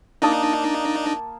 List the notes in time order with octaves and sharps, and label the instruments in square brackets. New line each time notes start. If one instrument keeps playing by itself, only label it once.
[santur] A#3 A5 D#6 [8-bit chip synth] D4 D#4